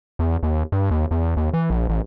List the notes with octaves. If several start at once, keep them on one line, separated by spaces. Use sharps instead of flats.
E2
D#2
G2
D#2
E2
D#2
E3
A#1
A1